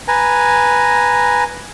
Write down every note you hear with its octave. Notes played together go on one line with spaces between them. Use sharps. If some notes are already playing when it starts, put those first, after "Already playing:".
B4 G#5 A#5